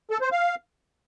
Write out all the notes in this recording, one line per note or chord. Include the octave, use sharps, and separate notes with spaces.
A4
C5
F5